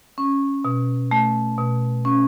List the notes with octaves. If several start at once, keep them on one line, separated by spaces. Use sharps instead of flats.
C#4
B2
A3
B2
C#4